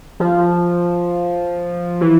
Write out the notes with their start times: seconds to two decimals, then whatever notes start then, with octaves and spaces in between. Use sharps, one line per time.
0.20 F3
2.01 E3